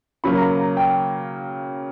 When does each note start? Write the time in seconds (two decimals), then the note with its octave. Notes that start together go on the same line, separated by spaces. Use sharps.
0.24 C#3 F#3 A#3 B5
0.37 A#5
0.42 B5
0.60 A#5
0.77 G5